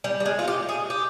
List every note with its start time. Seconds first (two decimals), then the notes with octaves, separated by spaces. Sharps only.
0.04 G3
0.20 G3
0.25 G#3
0.39 F4
0.48 G4
0.69 G#4
0.90 G4